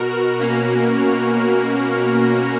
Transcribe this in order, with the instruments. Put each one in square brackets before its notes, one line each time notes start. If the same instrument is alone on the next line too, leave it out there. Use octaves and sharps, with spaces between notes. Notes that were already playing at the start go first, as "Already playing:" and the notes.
Already playing: [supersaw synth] B2 F#4 A#4
F#4 A#4
A#3 C#4